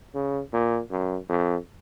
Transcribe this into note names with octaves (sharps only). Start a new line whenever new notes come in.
C#3
A#2
F#2
F2